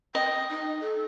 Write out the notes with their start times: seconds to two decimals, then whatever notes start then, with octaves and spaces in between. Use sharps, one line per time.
0.15 D#5 G5
0.50 D#4
0.81 A4